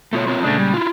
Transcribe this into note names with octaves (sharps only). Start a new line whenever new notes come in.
B2 A3 F4 C#5
C4 F4 C#5
A#2 C#3 G#3 A3 D4
G3
E4 F4